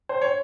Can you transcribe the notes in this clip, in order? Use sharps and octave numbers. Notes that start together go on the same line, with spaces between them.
C5
C#5